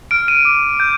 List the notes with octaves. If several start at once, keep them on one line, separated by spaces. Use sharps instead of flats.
F6 D7
D#7
D6
G6